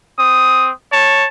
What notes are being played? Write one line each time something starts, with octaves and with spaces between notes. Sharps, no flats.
C4 D#6
C#5 A5